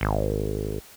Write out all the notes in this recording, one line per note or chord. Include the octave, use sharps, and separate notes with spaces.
G#1